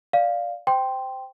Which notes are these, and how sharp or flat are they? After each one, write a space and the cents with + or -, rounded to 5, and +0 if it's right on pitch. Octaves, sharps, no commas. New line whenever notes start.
D5 +0 F5 +0
C5 -10 G5 +0 C6 +0